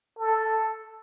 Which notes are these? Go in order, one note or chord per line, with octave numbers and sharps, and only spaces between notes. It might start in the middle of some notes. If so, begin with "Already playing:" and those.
A4